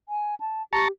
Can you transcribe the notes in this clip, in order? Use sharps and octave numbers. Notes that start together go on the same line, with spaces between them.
G#5
A5
G4 A5 A#5 C#6